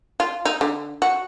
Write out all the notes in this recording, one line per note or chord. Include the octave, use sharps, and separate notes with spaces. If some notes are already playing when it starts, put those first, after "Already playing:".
F4
D#4
D3
F#4